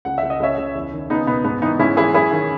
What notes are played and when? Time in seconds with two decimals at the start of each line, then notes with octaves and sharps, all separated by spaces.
0.05 C#2 F#5
0.18 C#2 E5
0.30 D#5
0.40 C#2 C#5 E5
0.57 C#2
0.75 E2
0.93 D#3
1.10 C#2 B3 D#4
1.27 B2 B3
1.44 G#2 B3
1.62 E3 B3 D#4
1.79 G#2 C#4 E4
1.97 E3 E4 G#4
2.14 F#2 E4 G#4
2.32 D#3